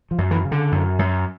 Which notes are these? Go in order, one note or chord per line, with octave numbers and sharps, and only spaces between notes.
F3
F#2
E3
C#3
D3
F#2
F#2